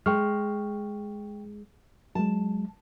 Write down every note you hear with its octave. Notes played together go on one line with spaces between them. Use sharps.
G#3 G5 C#6 F6
F#3 G#3 A5